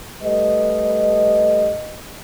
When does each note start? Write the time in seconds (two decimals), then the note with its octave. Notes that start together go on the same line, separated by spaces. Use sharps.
0.23 G3 A3 B4 D#5